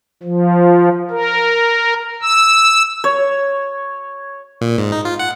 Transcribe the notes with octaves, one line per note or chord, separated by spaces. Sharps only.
F3
A#4
E6
C#5
A#2
G#2
D#4
F4
F#5